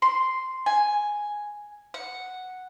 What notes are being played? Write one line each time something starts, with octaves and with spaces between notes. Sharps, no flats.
C6
G#5
F#5